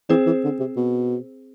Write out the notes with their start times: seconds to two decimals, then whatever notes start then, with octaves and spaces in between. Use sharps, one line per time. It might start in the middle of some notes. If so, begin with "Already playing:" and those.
0.09 E3 C4 G#4 C5
0.26 E3
0.44 D3
0.60 C3
0.77 B2